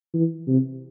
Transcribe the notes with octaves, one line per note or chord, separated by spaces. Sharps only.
E3
C3